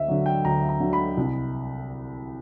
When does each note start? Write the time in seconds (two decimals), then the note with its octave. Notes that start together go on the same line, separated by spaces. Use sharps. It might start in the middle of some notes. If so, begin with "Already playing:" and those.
Already playing: D2 D#5 E5
0.08 D3 F#3
0.26 G5
0.45 D2 A#5
0.69 A#5
0.80 D3 F#3
0.93 B5
1.17 C2